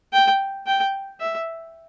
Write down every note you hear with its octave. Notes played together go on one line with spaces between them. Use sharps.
G5
G5
E5